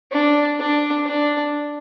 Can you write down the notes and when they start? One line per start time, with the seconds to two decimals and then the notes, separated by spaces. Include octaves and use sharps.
0.12 D4
0.59 D4
1.06 D4